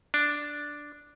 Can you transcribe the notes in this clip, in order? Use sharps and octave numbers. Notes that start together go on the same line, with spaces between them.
D4